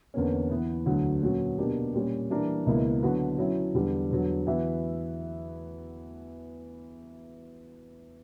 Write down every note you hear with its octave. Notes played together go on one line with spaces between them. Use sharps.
E2 D3 A#3 C#4
E3 B3 E4
D2 D3 F#3
A#2 F#3 C#4 F#4
B2 A#3 D4 G4
A#2 G3 C#4
E3 G3 A#3 D4 A#4
C#2 B2 A#3 E4
D3 F#3 B3 F#4 B4
F#3 C#4 E4
E2 D3 G3
E2 D3 F#3
E3 B3 F#4 B4 E5